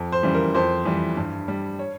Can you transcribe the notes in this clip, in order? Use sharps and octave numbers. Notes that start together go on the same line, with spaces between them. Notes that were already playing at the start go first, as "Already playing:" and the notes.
Already playing: F2
C5
C#3 E3 G3
A#4
F2 C5
E3 G3
G2
G3
C#5